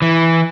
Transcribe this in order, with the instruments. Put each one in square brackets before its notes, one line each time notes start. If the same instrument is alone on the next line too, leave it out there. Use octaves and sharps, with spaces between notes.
[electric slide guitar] E3